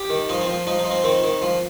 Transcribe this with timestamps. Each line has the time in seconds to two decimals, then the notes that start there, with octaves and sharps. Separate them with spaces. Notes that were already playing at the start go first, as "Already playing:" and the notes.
Already playing: G4
0.10 D#3
0.29 F3 D#4
0.41 C4
0.47 F3
0.67 F3 D#4
0.79 D#4
0.85 F3
0.91 C4
1.04 D#3 C4
1.23 D#3
1.42 F3